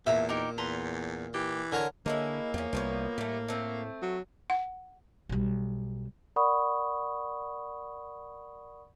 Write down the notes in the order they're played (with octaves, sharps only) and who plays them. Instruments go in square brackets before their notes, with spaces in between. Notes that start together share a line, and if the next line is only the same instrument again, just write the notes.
[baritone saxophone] E2 [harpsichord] A#2 [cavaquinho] E5 F5 A#5
[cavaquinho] D#4 G4 A#4
[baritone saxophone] E2 [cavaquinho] B4 A#5 C6
[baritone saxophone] E3 [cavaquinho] G4
[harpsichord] D3 A#4 C#5 [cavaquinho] G#5
[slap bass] D3 [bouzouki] G#3 C#4 E4 [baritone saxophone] A#3
[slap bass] E2 [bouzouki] F3 C#4
[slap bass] C2 [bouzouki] F3 B3 C#5
[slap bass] A2 [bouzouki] G3 A3
[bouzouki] A3 C4
[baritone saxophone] F#3
[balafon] F#5
[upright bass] B1 G3
[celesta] A#4 D5 F#5 B5 C#6 D#6